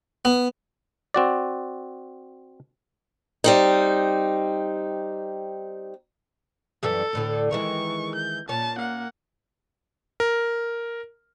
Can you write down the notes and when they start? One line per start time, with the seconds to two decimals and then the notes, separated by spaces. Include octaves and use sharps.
0.25 B3
1.14 C4 F#4 D5
3.44 G3 C4 D#4
6.83 F#2 E3 G3 A4
7.13 D2 A2 D3
7.51 D#3 E3 G#3 C#6
8.15 G6
8.49 A#2 C#4 A5
8.77 A#3 F#5
10.20 A#4